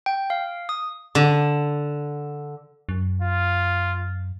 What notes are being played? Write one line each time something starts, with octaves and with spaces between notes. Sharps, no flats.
G5
F5
D#6
D3
F#2
F4